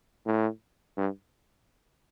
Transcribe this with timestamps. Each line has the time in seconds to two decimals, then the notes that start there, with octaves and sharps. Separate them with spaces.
0.26 A2
0.97 G2